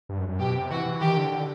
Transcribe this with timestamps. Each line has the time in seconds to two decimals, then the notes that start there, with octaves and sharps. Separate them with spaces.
0.09 G2
0.18 F#2
0.29 F#2
0.39 B2 G4
0.55 C3
0.70 E3 F#4
0.86 E3
1.01 D#3 G4
1.17 D3
1.32 D3